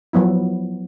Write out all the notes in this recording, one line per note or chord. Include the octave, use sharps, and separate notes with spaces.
F3 F#3 B3 E4